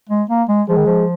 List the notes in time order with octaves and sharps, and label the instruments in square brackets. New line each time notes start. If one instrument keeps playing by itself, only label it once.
[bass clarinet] G#3
A#3
G#3
[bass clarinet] F3 [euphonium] G#3
[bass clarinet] D#3
F3